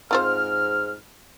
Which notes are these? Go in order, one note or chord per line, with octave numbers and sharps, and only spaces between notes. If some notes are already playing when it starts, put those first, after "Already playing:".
G#2 C4 F4 C5 F6